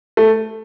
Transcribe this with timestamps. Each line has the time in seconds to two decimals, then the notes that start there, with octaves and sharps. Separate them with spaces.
0.17 A3